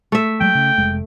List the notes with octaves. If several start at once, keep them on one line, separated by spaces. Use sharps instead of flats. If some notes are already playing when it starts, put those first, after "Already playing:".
A3 E5
F#3 G#3 G5
C#3
F1 G#3